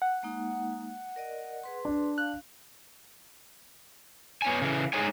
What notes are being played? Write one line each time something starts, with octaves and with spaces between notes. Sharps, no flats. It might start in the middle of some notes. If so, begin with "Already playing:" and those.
F#5
G#3 A#3 D#4
A#4 D5 D#5
G#4 B4 C6
D4
F5 F#6
B3 C#5 G#5
C#3 E3
G#3 D#4 G#4 C5 C#5 G#5